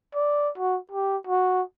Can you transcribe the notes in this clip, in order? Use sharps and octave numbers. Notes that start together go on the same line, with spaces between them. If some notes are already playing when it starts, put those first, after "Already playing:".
D5
F#4
G4
F#4